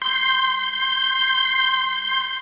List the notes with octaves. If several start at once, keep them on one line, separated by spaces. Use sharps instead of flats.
C6 G6